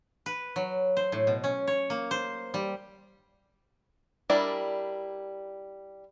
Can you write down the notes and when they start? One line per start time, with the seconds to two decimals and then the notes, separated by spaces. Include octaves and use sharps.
0.26 B4
0.56 F#3
0.97 C5
1.12 A2
1.27 B2
1.44 C#4
1.67 C#5
1.90 A#3
2.11 C5
2.54 G3
4.30 G3 D4 E4 A#4 D5